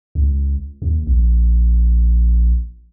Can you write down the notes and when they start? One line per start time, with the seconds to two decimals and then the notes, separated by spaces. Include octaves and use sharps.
0.15 C#2
0.82 D#2
1.07 A#1